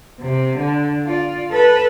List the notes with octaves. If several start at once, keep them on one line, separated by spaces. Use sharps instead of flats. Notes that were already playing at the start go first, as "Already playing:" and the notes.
C3
D3
F4 D5
A4 B4